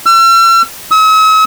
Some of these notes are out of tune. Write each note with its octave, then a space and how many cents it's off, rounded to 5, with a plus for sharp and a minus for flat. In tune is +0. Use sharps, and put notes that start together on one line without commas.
E6 +45
E6 -45